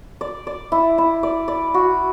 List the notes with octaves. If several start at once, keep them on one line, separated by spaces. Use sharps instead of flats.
D5
D5
E4
E4
D5
D5
F#4